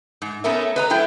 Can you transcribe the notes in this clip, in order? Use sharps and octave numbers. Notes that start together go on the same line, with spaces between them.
G#2
A3 B3 C#4 A#4 E5
B4 D#5 A#5
F#3 A3 E4 G5